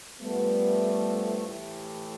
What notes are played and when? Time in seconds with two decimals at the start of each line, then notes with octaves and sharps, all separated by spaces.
0.21 G2 F3 G3 A3 B3
1.46 A2 E3 A3 E4 G4